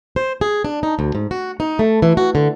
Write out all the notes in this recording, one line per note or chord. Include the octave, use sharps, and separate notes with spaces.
C5
G#4
D4
D#4
D2
G#2
F#4
D#4
A3
E3
F#4
D3